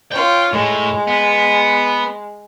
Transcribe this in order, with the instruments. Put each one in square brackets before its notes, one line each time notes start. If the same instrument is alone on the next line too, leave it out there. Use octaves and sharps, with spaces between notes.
[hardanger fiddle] F4 C#5 [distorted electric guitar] G5
[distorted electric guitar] A2 [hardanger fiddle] G#3
[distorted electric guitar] B3